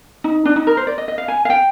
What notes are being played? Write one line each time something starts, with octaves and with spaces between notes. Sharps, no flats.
D#4
D4
D#4
A#4
C5
D5
D#5
D#5
F5
G#5
F5
G5